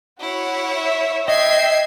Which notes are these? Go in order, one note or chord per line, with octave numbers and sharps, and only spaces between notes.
E4 F#4 C#5
E5
D#5 E5 G5 G#6 C7